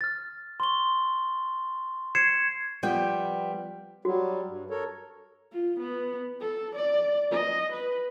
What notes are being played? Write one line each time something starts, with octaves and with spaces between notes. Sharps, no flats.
F6 A6
C6 C#6 G7
G#6 C7 C#7 E7
F3 G3 B3 G5
F#3 G3 F#4
G2
A4 A#4 C#5
F4
B3
A4
D5
D#5
B4